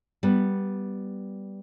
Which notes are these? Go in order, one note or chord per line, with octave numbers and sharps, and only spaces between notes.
G3 B3